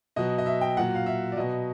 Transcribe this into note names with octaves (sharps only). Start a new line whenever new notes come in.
B2 F#3 D#5
D#5
E5
G5
A#2 F#3 F#5
F5
E5
D5
B2 F#3 D#5